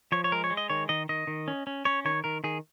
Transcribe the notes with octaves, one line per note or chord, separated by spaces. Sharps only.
F3 C#5
C#5
G#3 A#4
C#5
G#3
D#5
D#3 C#5
D#3 D#5
D#3 D#5
D#3
C#4
C#4
C#4 C#5
D#3 C#5
D#3 A#4
D#3 G#4